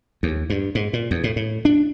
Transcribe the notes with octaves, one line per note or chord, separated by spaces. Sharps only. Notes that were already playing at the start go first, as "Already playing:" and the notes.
D#2
G2
G#2
A#2
E2
A2
A2
D4